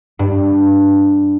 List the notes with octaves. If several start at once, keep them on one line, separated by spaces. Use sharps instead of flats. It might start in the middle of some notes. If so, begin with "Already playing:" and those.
G2